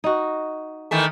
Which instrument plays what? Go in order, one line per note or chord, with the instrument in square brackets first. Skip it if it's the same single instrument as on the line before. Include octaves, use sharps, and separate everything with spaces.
[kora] D#4 F#4
[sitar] D#3 E3 A3